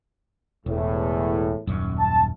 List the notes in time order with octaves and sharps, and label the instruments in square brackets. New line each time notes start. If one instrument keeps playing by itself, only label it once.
[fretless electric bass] E1 [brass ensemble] E2 A2
[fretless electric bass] D#1 F#2
[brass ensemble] A5